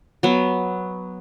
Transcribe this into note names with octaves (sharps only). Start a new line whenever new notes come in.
F#3 B3